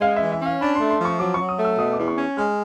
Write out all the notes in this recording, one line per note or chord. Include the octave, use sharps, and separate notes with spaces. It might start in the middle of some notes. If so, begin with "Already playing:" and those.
G#3 F5
E5
E3
E5
C#4 F5
D4 B5
C6
A3
C6
F3 C#6
F#3 D6
F#3 C#6
D#6
A3
E6
B2 D#6
D6
E2
C#6
C#4
G#3 F6